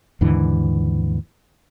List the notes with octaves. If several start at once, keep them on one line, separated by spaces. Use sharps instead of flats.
D#2 G#2 D3 E3